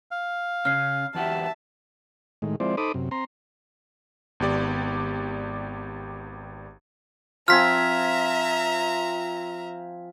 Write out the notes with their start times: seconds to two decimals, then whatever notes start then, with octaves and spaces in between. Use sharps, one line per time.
0.11 F5
0.65 C#3 C#4 F6 C7
1.15 E2 F#4 G4 E5 A5
2.42 A2 D#3 G#3
2.60 F3 G#3 C4 E4 C5 D5
2.77 D#4 A4 C5 B5 D6 D#6
2.94 F#2 C3
3.11 C4 A#5 C6
4.40 G#1 B3 G4 D5
7.48 F3 C4 E5 G#5 A#5 F6 B6